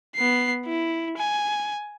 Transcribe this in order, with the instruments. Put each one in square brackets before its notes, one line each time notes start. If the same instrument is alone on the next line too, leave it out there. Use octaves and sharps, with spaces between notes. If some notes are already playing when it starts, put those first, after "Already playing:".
[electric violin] B3 C7
E4
G#5